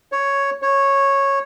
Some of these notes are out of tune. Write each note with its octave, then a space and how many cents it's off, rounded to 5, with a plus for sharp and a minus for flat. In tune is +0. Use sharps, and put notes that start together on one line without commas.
C#5 +5
C#5 -10